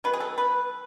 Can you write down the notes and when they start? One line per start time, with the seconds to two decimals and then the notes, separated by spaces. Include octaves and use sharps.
0.04 D#3 F#3 B3 B4
0.13 G#4
0.20 A4
0.38 B4